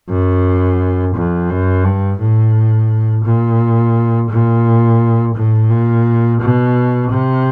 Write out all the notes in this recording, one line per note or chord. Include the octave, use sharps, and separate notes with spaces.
F#2
F2
F#2
G2
A2
A#2
A#2
A2
A#2
B2
C3